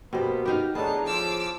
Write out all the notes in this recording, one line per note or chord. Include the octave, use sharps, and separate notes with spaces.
B2 A#3 B3 G4 C5
D#4 F#4 G4 C5 F5
A2 E3 B3 D4 D#4 G#4 C#5 A5
F3 D6 E6